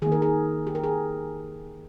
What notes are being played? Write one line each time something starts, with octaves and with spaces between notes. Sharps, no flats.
D#3 A#3 G#4
A#4
G#4
G4
A#4
G#4